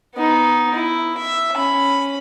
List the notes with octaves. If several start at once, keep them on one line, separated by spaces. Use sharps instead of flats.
B3 D#4
E4
E5
C#4 B5